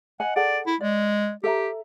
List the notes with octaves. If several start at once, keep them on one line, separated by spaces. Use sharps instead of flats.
D#5 F#5 G#5
G#4 A4 D5 F#5
E4
G#3 D5
G4 A4 E5 A#5